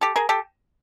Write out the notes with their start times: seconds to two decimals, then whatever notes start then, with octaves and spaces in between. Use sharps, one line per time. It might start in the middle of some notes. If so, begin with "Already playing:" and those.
0.01 G4 A4
0.16 G#4 A#4
0.29 G4 A4